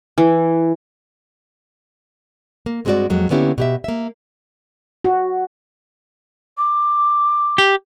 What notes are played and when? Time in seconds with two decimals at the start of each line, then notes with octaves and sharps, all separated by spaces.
0.18 E3
2.66 A#3
2.85 G2 G#3 C4 D4 F#4 D5
3.10 F2 F#3 G#3 A#3
3.30 D3 A#3 B3 C#4 E4 G4
3.58 B2 G4 E5
3.84 A#3 E5
5.04 F#4
6.57 D6
7.58 G4